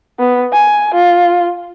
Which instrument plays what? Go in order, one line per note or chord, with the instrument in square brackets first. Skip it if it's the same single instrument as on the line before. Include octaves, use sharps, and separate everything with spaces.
[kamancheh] B3
G#5
F4